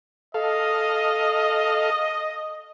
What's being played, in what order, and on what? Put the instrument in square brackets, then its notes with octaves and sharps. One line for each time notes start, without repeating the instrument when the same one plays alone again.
[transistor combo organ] A4 F5 [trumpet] D#5